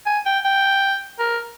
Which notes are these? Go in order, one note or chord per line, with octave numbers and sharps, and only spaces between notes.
G#5
G5
G5
A#4